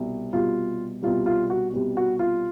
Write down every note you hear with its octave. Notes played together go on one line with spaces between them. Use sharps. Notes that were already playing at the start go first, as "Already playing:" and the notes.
Already playing: C2 B2 G3
C2 B2 G3 F4
C2 B2 G3 F4
F4
F#4
C2 B2 G3
F#4
F4